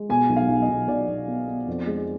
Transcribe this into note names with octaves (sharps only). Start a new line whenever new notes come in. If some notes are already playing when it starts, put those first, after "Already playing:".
Already playing: G#3
B2 G#5
B1
F5
B1
D#5
B1
B1 D5
B1
B3
B3
F2
G#3